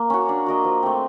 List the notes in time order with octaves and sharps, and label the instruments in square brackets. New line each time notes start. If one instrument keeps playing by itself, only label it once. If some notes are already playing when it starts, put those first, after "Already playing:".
Already playing: [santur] A#3
C#4 F#4
D4
F#4 A#4 D#5
F3
A3 C4